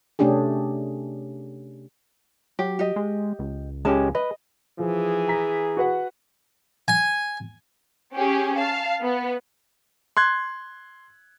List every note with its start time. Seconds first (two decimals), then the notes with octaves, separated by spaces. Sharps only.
0.19 C3 A3 C#4 D4 G4 G#4
2.59 F#3 G4
2.79 G4 D#5
2.96 G#3
3.39 C#2
3.85 G#3 C#4 G4 A5
4.15 B4 D#5
4.79 E3 F3 G#4
5.28 A#5 B6
5.77 F#4 B4 F#5
6.88 G#5
8.15 C#4 G4 G#4
8.56 F5 A5
9.02 B3
10.17 C6 F#6 G#6